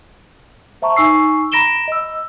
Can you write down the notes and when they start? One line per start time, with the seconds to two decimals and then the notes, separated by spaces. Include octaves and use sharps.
0.82 C5 E5 A5 A#5 C#6
0.97 D#4 G#5 C#6 E6 C7
1.52 A#5 B5 A#6 D7 E7 G7
1.88 D#5 E6